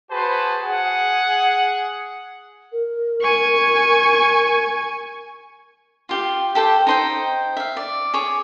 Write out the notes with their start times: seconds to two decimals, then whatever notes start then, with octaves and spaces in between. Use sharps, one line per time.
0.12 F#4 G#4 B4 C5 A5
0.64 G#4 F#5
2.72 A#4
3.21 G#5 C#6
6.09 F4 G4 F5
6.55 G4 A4 C5 G5
6.87 D#4 C5 G5
7.57 E5 F5
7.77 D5
8.14 G#4 C#5 D6